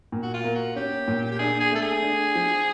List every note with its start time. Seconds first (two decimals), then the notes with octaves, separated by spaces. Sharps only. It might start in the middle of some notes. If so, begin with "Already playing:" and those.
0.12 A#2
0.23 F#4
0.34 F4
0.44 A#3
0.55 F#4
0.76 C#4 G4
1.08 A#2
1.31 G4
1.39 D4 G#4
1.61 G#4
1.72 A3 A4
1.82 G#4
2.03 D4
2.35 F3